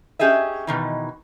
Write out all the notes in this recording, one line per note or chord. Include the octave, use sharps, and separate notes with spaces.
C#4 G4 G#4 D#5 E5
B2 D#3 E3